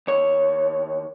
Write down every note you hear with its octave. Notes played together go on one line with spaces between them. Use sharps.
D#2 C#5